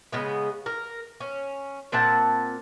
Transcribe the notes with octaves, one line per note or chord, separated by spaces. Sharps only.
C#3 G#3 B3
A#4
C#4
A#2 C4 F#5 A5